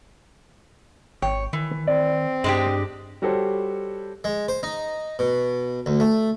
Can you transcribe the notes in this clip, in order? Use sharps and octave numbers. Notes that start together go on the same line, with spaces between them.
G#1 C#5 G5
D#3 E3
C4 D5
G2 G#3 D4 G4
G3 F#4 G4 A4 C5 C#5
G#3
C5
D#4
B2
D2
A3